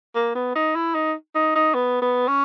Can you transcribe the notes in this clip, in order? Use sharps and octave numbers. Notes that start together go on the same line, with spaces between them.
A#3
B3
D#4
E4
D#4
D#4
D#4
B3
B3
C#4